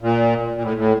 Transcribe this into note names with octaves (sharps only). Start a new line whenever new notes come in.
A#2
A#2
A2
A2